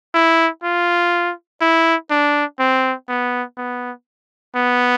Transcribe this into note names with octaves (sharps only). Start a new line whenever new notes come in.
E4
F4
E4
D4
C4
B3
B3
B3